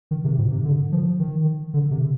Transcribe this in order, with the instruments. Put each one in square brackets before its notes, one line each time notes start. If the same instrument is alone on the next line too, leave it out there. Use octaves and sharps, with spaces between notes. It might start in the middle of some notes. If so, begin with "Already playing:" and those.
[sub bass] D#3
C3
G#2
C3
D3
F3
D#3
D3
C3